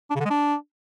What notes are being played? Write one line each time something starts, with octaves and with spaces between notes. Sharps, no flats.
D4
C#3
D3
G#3
D4